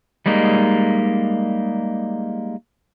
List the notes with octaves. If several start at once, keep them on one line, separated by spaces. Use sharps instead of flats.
G3 G#3 A#3 D#4